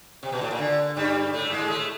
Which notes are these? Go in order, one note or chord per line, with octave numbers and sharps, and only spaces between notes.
C3
B2
A2
A#2
D3
G2 G3
A2 A3
G#2 G#3
A2 A3